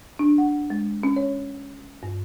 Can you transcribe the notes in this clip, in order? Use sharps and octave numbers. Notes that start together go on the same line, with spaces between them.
D4
F#5
G#3
C#4
C#5
G2